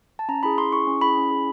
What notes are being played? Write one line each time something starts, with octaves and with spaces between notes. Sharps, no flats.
A5
C#4 A#5
E4 G#4 B5
C#4 C6
E4 G#4 C#6
C#4
E4 G#4 B5
C#4
E4 G#4